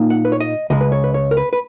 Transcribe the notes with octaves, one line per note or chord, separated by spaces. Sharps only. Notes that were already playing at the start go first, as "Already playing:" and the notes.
Already playing: A#2 A#3 D#4
F#5
B4
C#5
D#5
C#2 C#3 G#3 D#5
B4
C#5
B4
C#5
A#4
B4
B4